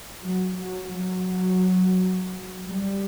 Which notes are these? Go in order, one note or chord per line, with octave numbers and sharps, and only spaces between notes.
F#3
F#3
F#3
G3